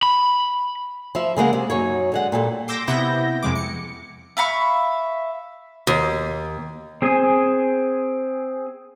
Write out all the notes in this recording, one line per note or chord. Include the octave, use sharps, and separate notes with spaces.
B5
F3 E5
C#3 G#3 A#3 F#5
C3
F#2 D#4 C#5
D3 G#3 F#5
A#2 G3 A4
C6 D6 E6 G6 A#6
C3 B3 E4 G6 A#6
F2 C3 G#3 D6
C#7
E5 F5 B5 C#6
D#2
C4 G#4 G#5